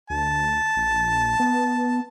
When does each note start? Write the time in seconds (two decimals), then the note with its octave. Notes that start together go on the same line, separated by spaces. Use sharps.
0.10 D2 A5
0.76 A#1
1.40 B3